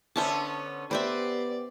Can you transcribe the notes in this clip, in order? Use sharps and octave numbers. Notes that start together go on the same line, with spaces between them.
D3 B3 C#4 C5 E5 A5
B3 C4 G4 B4 C5 D5 E5